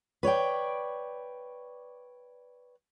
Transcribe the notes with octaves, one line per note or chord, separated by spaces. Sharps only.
B4 C#5 D5 G5